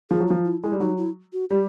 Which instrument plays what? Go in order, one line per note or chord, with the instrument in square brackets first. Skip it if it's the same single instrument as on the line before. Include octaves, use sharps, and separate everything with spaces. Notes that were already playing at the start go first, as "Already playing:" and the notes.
[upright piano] F3 [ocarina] G#4
[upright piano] F#3
[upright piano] F3 [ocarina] F4
[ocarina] E4
[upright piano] G#3 [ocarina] E4
[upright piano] G3
[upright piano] F#3 [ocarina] D#4
[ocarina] E4
F#4
[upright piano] G3 [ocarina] G4